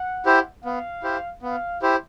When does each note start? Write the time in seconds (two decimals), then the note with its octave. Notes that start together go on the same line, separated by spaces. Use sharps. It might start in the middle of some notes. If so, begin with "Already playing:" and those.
Already playing: F#5
0.26 E4 G4 C5
0.64 B3 F5
1.03 E4 G4 C5
1.42 B3 F5
1.82 E4 G4 C5